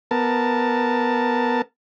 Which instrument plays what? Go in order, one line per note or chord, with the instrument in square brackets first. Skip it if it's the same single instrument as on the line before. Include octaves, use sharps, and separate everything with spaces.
[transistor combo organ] B3 A#4 A5